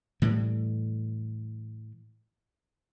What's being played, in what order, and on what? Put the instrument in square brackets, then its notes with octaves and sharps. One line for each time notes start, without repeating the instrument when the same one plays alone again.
[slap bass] A2 E3 G3